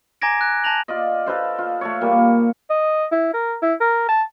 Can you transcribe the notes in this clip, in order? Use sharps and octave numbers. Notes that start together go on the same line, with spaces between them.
G#5 A#5 D6 G#6 A#6 D7
F#6
A5 G6 A#6 F7 F#7
F4 D5 D#5
A4 B4 C5 F5
F4
A3 A4 C#5
A#2 G3 A#3
F4
D#5
E4
A#4
E4
A#4
A5